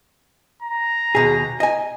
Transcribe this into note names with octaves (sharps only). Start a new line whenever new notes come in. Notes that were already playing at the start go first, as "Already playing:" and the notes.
A#5
D#2 B2 G#4
D#5 G#5